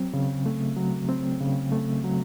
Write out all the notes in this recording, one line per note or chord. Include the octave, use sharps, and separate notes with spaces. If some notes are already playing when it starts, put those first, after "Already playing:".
Already playing: F#3 C4
C#3
A3
F#3
C4
C#3
A3
F#3